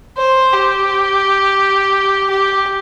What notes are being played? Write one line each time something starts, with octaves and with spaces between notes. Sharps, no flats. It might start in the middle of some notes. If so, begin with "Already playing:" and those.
C5
G4
G4